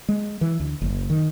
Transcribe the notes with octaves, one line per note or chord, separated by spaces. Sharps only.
G#3
E3
D2
F#1
D#3